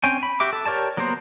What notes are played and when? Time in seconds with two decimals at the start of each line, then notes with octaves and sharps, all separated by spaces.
0.04 C4 C#4 G5 G#5
0.23 B5
0.40 F#4 G4 E5 D6
0.53 A4
0.65 G4 A#4 C#5 D5 A5
0.97 F#3 A#3 B3 A#4 C5